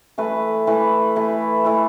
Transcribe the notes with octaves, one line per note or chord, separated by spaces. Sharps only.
E3 A3 E4 B4
E3 A3 E4 B4
E3 A3 E4 B4
E3 A3 E4 B4